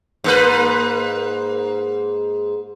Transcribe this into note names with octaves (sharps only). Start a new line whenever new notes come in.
G#2 A#3 B4